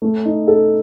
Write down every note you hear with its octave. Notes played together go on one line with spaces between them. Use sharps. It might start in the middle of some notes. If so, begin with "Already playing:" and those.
A3
D#4
A4